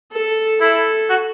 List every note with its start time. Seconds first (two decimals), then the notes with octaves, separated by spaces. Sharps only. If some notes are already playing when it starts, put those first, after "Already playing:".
0.12 A4
0.61 E4 A4
1.10 F#4